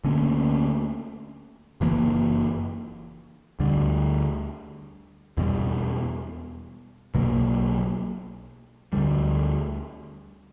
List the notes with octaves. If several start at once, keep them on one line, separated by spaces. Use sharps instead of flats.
D2 D3 A#3 C#4
F#1 F#2 E3 A#3
D2 D3 G3
E2 B2 G3
B1 B2 F#3 A#3
D2 D3 G3